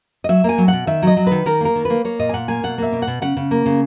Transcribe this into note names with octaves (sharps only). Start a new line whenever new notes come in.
D#5
F#3 E5
A#3 G#5
F#3
B2 F#5
D#3 E5
F#3 D#5
F#3
D#3 B4
D#3 A#4
A#3 A#4
D#3
A#3 B4
A#3 C#5
A#2 D#5
G#5
A#2 F#5
A#3 G#5
B2 F#5
A#3 E5
B2
F#5
B2
C#3 F#5
C#3
A#3
C#3